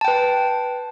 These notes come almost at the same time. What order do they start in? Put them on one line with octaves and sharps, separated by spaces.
A5 G5 B4